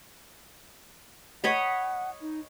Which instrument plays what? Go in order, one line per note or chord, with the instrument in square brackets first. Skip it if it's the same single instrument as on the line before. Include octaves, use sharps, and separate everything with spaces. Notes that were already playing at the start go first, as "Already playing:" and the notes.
[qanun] C#5 D#5 B5 [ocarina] F#5
[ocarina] D#4